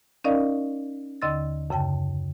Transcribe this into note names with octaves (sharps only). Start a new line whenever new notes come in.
C#4 D#4 A#4 D5 D#5 F5
D#2 D3 D#5 C6 E6 A6
F#2 C#3 G5 A5